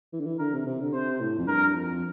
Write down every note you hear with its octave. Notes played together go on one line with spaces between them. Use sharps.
E3
D3
E3
D3 A#4
C3
C3
D3
C3 C5
A2
F2
G2 A#4
F2